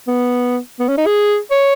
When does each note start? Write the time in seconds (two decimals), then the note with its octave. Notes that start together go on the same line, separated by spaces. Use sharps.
0.08 B3
0.79 B3
0.88 C#4
0.97 D#4
1.06 G#4
1.51 C#5